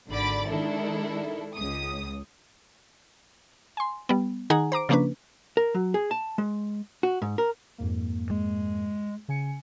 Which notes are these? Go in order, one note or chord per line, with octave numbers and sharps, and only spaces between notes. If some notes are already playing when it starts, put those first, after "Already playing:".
G#1 D3 D5 B5 D6 A6
D#3 G#3 D4 E4 A4
C#2 D#6
G#5 C6
G3 B3
D#3 D#4 G#4 F#5 G#5 A#5
C5 A#5 D6 D7
C#3 F3 A#3 C#4 D4 B4
A#4
F#3
G#4
A5
G#3
F#4
G#2
A#4
F2 G#2 A#3
G#3
C#3 G#5 C#7